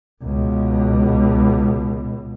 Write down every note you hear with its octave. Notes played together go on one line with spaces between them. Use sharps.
C#2 B2